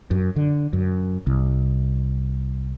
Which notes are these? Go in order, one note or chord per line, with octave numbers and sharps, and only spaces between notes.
F#2
D3
F#2
C2